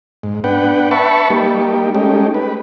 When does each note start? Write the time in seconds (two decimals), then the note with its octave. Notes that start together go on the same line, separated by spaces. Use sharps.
0.23 G#2
0.44 B3 D4 B4 F#5 G5
0.91 B4 E5 A5 B5 C#6
1.30 G3 A#3 D#4 G4
1.95 G#3 A3 C#4 D#4 G4
2.34 B4